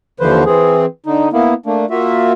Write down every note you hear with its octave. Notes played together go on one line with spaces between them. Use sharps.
D#2 D3 E3 F3 B4 C5
E3 C4 G#4
D3 D#4
A#3 B3 E4
A3 A#3 D4
A#3 F4 F#4 E5